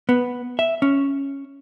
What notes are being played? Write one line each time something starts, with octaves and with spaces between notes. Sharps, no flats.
B3
E5
C#4